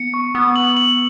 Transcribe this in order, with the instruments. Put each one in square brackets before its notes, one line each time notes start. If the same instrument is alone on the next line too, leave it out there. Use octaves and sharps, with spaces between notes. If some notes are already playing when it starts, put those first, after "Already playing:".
Already playing: [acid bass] B3 [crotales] C#7
[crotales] C#6
[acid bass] B3 [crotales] E6
[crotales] F#7
F#7